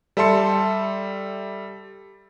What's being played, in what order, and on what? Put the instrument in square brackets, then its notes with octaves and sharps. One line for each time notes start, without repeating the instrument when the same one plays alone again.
[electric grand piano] G3 A4 E5 A5 C6 C#7